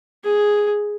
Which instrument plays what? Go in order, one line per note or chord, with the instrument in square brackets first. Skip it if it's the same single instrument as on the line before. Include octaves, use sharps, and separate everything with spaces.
[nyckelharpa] G#4